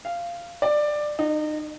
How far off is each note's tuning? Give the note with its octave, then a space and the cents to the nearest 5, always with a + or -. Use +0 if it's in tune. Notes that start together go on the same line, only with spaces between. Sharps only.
F5 -15
D5 +15
D#4 -30